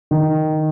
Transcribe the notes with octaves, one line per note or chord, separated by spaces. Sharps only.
D#3